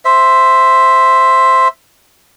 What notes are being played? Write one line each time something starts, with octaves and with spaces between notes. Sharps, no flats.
C5 E5